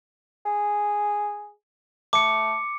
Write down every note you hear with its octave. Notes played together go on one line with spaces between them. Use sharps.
G#4
A3 D6 C#7